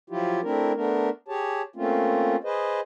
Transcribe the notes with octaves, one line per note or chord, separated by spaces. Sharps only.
F3 F#3 E4 F4 G4
A3 C4 D4 E4 A#4
A3 B3 D4 A#4
G4 G#4 C#5 A5
A3 A#3 C4 C#4 F4
G#4 B4 C5 D#5